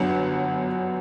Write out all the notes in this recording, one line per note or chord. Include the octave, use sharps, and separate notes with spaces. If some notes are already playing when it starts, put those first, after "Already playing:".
Already playing: G1 F#2 F#3 B3 D4 F#5